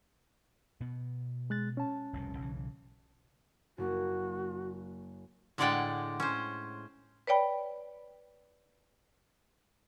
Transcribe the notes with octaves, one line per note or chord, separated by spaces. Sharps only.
B2 B3
G#3 F#6 A6
C#4 A5
F1 C2 B2
B1 C#3 E3
F#1 A#3 F#4
A2 D3 G#3 D5 F#5 G5
C#4 C5
B4 C#5 D5 G5 B5